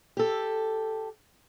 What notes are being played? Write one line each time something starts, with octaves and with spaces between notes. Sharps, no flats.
G4 A4